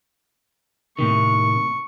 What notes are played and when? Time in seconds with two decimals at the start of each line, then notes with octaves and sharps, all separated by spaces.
0.99 A2 C3 D#3 C#6